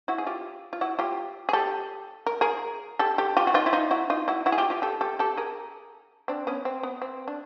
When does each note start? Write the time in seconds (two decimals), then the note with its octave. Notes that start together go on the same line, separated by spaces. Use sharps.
0.08 E4 F#4
0.18 G#4
0.27 F4 G4
0.73 F4
0.81 E4 F#4
0.99 F4 G4
1.49 G#4
1.53 G4 A4
2.26 A#4
2.41 G#4 A#4
2.99 G4 A4
3.18 G4 A4
3.37 F4 G4
3.47 F#4
3.54 D#4 F4
3.66 E4
3.73 D#4 F4
3.91 E4 F#4
4.10 D#4 F4
4.28 E4 F#4
4.46 E4 F#4
4.52 G#4
4.58 F4 G4
4.70 F4 G4
4.82 G4 A4
5.01 G4 A4
5.19 G4 A4
5.37 G#4 A#4
6.28 C4 D4
6.47 B3 C#4
6.65 C4
6.83 B3
7.02 C4
7.28 D4